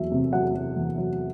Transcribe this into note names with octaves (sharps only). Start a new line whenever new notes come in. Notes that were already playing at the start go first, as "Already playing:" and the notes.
Already playing: E2 F#3 E5
C3
F#3 F#5
F#3
E2
F#3